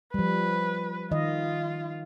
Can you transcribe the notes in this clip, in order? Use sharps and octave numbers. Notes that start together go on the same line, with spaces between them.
F3 G3 B4
D#3 F4 D#5